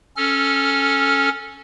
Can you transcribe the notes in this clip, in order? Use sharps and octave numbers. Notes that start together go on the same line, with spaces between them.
C#4 A4 F6